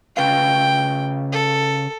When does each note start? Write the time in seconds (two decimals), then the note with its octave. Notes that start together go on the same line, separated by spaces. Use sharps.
0.17 C#3 B4 F5 G5
1.32 A4